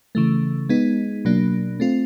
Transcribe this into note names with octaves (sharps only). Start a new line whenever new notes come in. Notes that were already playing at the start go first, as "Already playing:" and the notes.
C#3 E3 A3
G#3 B3 D#4
B2 F#3 A#3 D4
A3 C4 F4